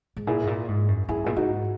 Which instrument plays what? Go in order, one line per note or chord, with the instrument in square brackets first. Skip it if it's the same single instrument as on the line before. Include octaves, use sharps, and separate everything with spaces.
[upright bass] G#2
[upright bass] A#2 [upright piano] E4 G#4
[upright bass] G#2
A#2
G#2
F#2
[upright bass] F#2 [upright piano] E4 G#4
[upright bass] A#2 [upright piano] G#4
[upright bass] G#2 [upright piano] D#4 F#4